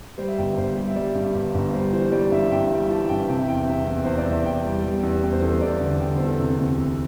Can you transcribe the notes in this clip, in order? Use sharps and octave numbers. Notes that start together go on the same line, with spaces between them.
G3 C5
E5
G1 G5
G1 C5
G3
E5
G3 D5
G2
G1
G1
G3 C5
E3 C5
C5
G3 D5
G2 E5
E5
G2 G5
G3
E3 A5
G2 G5
C3 G5
E5
E2 G5
C3 E5
E2
E2 C5
D5
E2
E5
E2 G5
G3
G3
E2
E2 G5
C5
E2 A4
C5
E2 D5
D3
D3 G5
E2 C5
A4
C3
D2
C3